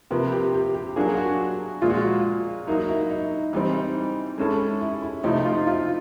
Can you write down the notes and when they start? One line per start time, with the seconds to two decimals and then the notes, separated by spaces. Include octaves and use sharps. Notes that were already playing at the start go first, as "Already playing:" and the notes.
0.11 C3 F3 A#3 B4
0.32 G4
0.54 G4
0.74 G4
0.96 F#3 A#3 D4 F4 F#4 G#4
1.17 F#4
1.82 A#2 F3 G#3 F4
1.90 F#4
1.98 F4
2.67 F#3 A#3 D#4 E4
2.88 E4
3.10 D#4
3.53 E3 G3 C4 D#4
3.74 D#4
4.38 G#3 C#4 E4 A4
4.81 E4
5.02 E4
5.23 C3 F3 A3 C4 D#4 E4
5.45 F4
5.67 F4